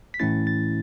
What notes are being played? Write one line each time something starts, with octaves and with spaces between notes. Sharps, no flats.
B6
A2 E3 A3 C#4 E4 A6
A6